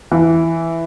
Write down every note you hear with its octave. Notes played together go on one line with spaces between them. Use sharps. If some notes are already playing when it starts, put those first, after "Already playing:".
E3